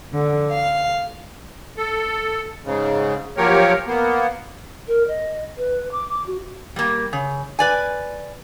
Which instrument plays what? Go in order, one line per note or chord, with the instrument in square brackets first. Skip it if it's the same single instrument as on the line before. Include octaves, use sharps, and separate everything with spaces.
[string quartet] D3
F5
[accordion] A4
G#2 C#3
F3 F#3 A#3 G4 A#4 C#5
A#3 B3
[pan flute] A#4
D#5
B4
D6
D6
F#4
[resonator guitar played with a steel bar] G3 A#3
C#3
B4 D5 G#5